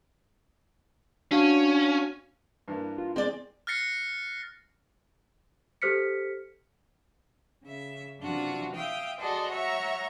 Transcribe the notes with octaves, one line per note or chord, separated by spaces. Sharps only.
C#4 D4 F#4 F5
G2 E3 A#3
F4
G#3 C4 D5
F6 F#6 A6 A#6 C7 C#7
G4 A4 C5 F6 B6 C#7
C#3 E5
F#2 C3 E3 D4 F4 F#4
E5 F5 G5 D#6
F#4 G#4 A4 D5 D#5 C6
C#5 E5 F#5 A#5 C#6